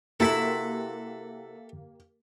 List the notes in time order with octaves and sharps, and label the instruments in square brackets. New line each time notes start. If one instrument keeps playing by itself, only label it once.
[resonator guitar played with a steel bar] C3 E4 F#4 [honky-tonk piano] A#3 G4 [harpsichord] A4 E5 B5